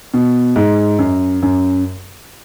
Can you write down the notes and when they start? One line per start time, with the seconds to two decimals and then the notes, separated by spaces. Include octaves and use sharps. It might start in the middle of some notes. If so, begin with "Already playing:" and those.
0.14 B2
0.56 G#2
0.99 F#2
1.42 F#2